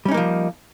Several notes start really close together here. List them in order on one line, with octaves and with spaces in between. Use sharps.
G3 C#4 D#4 A#3 F3